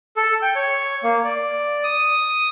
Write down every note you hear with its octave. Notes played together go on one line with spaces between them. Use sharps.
A4
G5
C#5
A#3
D5
D#6